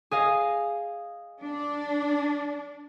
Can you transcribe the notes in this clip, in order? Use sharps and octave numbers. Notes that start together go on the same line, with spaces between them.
G#4 D#5 F5
D4